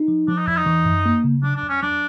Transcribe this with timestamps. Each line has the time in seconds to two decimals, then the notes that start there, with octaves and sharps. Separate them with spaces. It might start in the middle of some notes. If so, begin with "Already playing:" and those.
Already playing: D#4
0.08 F3
0.28 F3 D4
0.38 D#4
0.47 E2 E4
0.57 D#4
0.66 E3
0.86 F#2
1.06 A#3
1.24 C#3
1.43 F#3 D4
1.56 D4
1.63 E2
1.69 C#4
1.82 F#3 D4